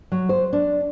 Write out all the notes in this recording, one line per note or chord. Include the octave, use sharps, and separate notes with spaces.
F#3
C5
D4